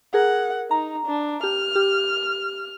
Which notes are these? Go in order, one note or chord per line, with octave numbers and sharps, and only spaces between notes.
G#4 A#4 F#5
D#4 A#5
D4
G4 F6
G4